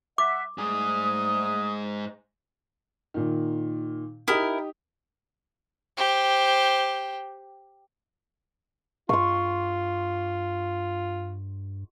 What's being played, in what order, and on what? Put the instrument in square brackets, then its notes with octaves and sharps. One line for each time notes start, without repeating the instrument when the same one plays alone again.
[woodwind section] E5 F#5 [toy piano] D6
[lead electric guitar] G#2 G#4 [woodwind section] G3 A3 D#6
[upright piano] A#2 D#3
[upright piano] D#4 G4 D#6 [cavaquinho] E4 A#4
[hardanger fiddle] G4 C5
[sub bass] G2 [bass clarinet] F4 [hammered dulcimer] C6 C#6